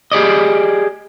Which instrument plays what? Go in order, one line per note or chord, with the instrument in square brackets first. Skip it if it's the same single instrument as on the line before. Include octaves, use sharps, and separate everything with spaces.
[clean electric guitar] G4 G#4 D5 D#5